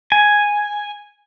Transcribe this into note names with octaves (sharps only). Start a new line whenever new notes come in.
G#5